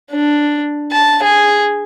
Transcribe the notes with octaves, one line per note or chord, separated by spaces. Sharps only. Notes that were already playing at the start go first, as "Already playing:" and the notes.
D4
A5
G#4